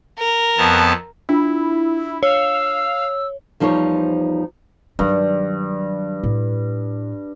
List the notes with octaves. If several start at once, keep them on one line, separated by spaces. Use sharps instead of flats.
A#4
F2 B3 A5
D4 E4 F4
C#5 F5 E6
E2 F3 G3 D#4 C5 C#5
G2 D#3 F#3
A2